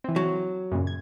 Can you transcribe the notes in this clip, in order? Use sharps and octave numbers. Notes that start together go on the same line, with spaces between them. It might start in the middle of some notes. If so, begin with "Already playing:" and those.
E3 C4
F#3
F#2 A#2 C#3
G#6